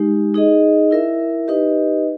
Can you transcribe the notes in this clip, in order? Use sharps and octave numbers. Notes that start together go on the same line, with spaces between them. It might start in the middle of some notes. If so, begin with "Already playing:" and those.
Already playing: G#3 D#4 G4
D#4 G#4 D#5
E4 A#4 E5
D#4 G4 B4 D#5